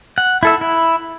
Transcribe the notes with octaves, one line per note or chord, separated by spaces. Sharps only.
F#5
E4 A4 E5
E4